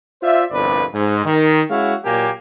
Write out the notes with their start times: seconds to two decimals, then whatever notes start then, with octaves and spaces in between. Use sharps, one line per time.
0.23 F4 C5 D5 E5
0.51 G1 C2 F2 B4 D5
0.93 G#2
1.25 D#3
1.69 G#3 C#4 E4 F#4 F5
2.04 A#2 F#3 A#3 G4 G#5